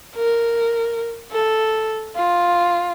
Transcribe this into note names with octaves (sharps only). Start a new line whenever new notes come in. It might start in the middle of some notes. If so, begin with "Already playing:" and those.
A#4
A4
F4